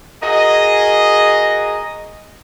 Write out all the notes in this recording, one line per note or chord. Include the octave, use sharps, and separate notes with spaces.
F#4 G#4 A#4 D#5